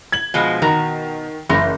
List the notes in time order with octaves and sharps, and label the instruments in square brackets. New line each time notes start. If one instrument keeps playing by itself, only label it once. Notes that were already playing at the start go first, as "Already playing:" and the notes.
[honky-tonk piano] G#6 F#7
[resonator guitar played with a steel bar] B2 F3 G#3
[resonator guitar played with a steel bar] B2 F#4 A#5 [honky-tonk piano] D#3
[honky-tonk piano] F#1 C6 [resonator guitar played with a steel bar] E3